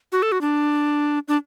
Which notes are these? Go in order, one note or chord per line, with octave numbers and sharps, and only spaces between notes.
F#4
A4
F#4
D4
D4